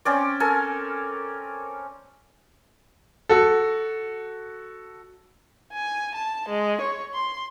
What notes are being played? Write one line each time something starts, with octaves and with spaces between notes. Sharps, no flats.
C4 C#4 D5
A4 A#4 G#5
F#4 A4
G#5
A5
G#3
C#5
C6